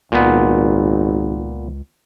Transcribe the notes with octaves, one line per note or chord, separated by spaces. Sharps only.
G#1 C#2 A#2 B3